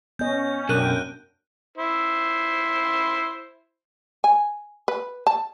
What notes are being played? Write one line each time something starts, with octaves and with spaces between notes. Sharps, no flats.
B3 C#4 D#5 G6
B1 F#2 D4 A#4 G5 F#6 D#7
E4 C5
G#5
B4
A5